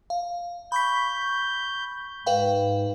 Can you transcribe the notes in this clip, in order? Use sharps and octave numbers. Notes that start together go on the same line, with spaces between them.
F5
B5 C#6 G6 B6
G#2 B4 F5 G5